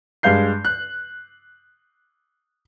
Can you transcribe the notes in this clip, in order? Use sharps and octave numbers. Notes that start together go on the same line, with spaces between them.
G2 G#3 F5 G6 C7
F#6